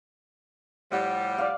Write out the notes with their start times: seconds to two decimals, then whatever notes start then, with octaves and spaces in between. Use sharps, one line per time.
0.92 A2 F3 G3 F#5
1.38 D5 F5